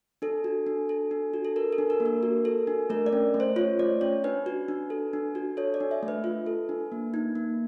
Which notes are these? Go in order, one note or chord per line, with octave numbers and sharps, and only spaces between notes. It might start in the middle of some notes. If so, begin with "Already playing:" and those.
D4 A4
F#4
D4
A4
D4
F#4
A4
A4 A#4
A4
D4
A#4
A#3
A#4
F#4
A4
D4
A3 A#4
D5
C#4
A3
C5
F4 C#5
A3 D5
C#4 C#5
D4 B4
F#4
D4
A4
D4
F#4
A4 C#5
D5
D4
E5
A3
B4
F4
A4
D4
A#3
D#4
A#3